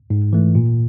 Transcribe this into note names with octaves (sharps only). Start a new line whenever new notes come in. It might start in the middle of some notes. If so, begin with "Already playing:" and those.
G#2
E3 A3
A#2